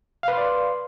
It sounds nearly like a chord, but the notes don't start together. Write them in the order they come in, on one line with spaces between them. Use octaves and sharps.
F5 B4 C6 D5